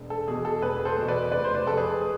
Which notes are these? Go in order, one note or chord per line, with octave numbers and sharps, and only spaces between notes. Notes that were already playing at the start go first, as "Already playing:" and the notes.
Already playing: E1
A4
E2 B2 G#4
A4
E1 G#4 B4
A4 C5
E2 B2
B4 D5
F1 B4 D5
C5
B4 D5
F2 C3 A4
G#4 B4
G#4